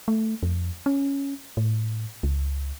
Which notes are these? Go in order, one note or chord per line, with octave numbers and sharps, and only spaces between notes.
A3
F2
C#4
A2
C#2